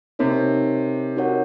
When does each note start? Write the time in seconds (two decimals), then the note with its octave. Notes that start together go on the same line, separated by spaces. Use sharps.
0.19 C3 D#4 A#4 C#5
1.16 D#4 F#4 A#4 C#5 F#5